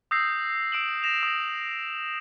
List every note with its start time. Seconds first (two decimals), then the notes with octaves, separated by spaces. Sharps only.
0.11 D#6 E6 G6 A#6 C7
0.72 E6 D7 E7 F#7
1.03 A#6 E7 F7
1.23 D#6 A#6